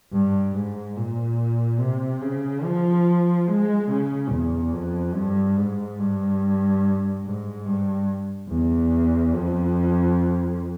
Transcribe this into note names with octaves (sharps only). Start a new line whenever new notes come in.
G2
G#2
A#2
C3
C#3
F3
G#3
C#3
E2
F2
G2
G#2
G2
G#2
G2
E2
F2